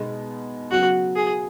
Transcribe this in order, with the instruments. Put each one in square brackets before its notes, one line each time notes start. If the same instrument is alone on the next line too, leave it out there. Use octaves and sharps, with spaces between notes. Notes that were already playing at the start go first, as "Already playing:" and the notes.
Already playing: [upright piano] B2 G#3 B3 D#4
[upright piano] C#3 F#3 B3 [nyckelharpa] F#4
[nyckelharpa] G#4